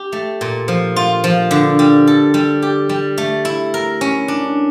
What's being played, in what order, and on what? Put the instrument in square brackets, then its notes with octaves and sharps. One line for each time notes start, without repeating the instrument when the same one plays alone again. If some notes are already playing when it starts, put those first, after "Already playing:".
Already playing: [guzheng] G4
A3
A#2
F3
F4
F3
D3
G3
A4
G3
G4
G3
A3
E4
A#4
C#4
D4